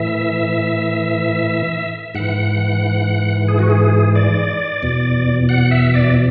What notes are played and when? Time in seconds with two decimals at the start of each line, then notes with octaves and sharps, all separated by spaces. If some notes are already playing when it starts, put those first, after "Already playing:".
Already playing: A2 E3 E5
2.15 G#2 E3 F#5
3.48 G#4
3.59 F#4
3.70 G#4
4.16 D5
4.83 E2 B2
5.49 F#5
5.71 E5
5.94 D5